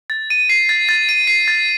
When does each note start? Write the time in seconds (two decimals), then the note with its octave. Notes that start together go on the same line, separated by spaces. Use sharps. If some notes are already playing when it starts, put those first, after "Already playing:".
0.10 A6
0.30 D#7
0.49 C7
0.69 A6
0.89 A6
1.09 D#7
1.27 C7
1.48 A6